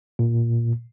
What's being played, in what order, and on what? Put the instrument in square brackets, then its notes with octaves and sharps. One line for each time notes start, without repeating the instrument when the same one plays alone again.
[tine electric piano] A#2